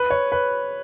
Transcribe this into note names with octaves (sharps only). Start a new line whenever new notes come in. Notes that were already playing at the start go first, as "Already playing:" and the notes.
Already playing: B4
C#5
B4